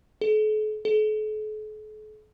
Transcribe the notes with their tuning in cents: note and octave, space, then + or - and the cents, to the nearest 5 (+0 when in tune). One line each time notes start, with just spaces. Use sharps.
A4 -45
A4 -45